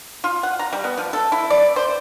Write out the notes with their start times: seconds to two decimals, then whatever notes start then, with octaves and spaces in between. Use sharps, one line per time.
0.24 F4
0.43 F#5
0.59 A#5
0.73 G3
0.84 B3
0.98 F3
1.13 A4
1.32 E4
1.50 D5
1.76 C5